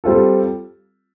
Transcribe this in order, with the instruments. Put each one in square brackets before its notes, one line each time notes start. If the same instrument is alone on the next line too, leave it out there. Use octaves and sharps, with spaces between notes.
[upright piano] G3 C4 F4 A4